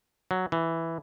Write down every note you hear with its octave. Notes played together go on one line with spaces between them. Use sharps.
F#3
E3